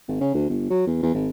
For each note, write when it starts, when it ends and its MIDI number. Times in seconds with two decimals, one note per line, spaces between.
0.08 0.20 32
0.21 0.34 49
0.34 0.48 38
0.49 0.67 31
0.70 0.82 54
0.87 1.00 40
1.02 1.13 40
1.14 1.29 32